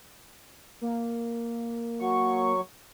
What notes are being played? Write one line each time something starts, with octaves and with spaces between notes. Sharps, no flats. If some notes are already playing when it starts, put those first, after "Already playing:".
A#3
F#3 C#6